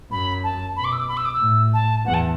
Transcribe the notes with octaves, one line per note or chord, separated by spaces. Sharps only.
F#2 B5
A5
B2 B5
D6
E6
D6
B5
E6
D6
E6
A2
A5
E2 F#5
A5